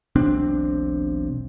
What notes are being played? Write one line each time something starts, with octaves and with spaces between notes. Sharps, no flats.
E1 B1 C4 D4